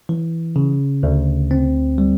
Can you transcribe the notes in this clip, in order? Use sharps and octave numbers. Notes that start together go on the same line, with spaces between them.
E3
C#3
D2
C4
G3